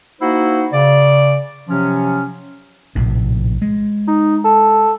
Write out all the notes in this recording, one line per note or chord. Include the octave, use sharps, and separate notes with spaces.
A#3 D#4 E4 F#4 C5 F#5
C#3 D5
C3 F3 F#3 C#4
A#1 A2 C3
G#3
D#4
A4